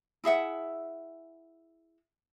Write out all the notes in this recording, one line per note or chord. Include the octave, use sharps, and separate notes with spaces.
E4 G#4 E5 F#5